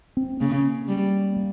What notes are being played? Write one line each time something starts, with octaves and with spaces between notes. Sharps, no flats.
C4
C#3 A#3
G3
A#3